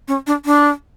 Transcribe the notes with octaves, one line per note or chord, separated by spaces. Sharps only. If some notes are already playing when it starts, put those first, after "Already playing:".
C#4
D4
D4